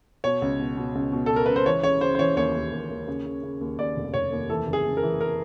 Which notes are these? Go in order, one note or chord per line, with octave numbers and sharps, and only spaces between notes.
B2 C#5
C#2
B2
B2
C#2
B2
B2 A4
A#4
C#2 B4
C5
E3 C#5
C#3 C#5
C#3 C5
C5
E3 C#5
D#2 C#5
D#2
D#2
D#2
C#3
C#3
C#3
D#2
D#2 D5
F1
F1 C#5
D#2
E3 A4
F#1
G#4
F#1
A#4
E3
A#4